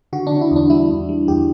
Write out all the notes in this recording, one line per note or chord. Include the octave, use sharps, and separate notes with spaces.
D3 F#4
D4
D3
D4
E4
E2
D4
G3 E4
E2
G3
E2 G4